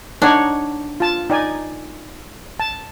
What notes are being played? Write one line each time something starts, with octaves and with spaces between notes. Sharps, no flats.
D4 D#4 C#5 F#5
F4 A5
D#4 D5 G#5
A5